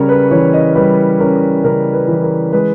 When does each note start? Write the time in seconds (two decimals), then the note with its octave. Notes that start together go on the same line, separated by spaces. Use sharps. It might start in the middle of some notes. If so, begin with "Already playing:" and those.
Already playing: C#3 G3 C#4 A#4 C#5
0.09 B4
0.31 E3 C#5
0.53 D#5
0.75 G3 B4
1.20 C#4 A#4
1.64 C#3 A#4
1.93 B4
2.08 E3
2.23 A#4
2.53 G#3 B4